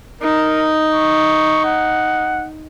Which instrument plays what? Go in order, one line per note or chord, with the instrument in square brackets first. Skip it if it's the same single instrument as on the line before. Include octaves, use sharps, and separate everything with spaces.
[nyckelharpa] D#4 [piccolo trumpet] A#4
[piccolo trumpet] C#6
F#5